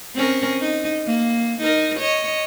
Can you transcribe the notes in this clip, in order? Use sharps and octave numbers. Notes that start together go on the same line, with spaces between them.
C4 C#4 A#4
D#4
A#3
D#4 A#4
C#5 D#5